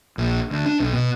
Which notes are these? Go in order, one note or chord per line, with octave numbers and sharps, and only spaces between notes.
A#1
D2
D4
B1
B2